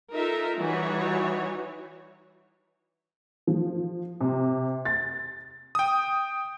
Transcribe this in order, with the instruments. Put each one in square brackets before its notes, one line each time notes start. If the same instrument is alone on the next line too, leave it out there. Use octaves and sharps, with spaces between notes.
[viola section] D#4 F4 A4 A#4 E5
E3 G3 D#4 F#4 C#5
[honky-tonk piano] F3
C3
A6
[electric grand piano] G5 D#6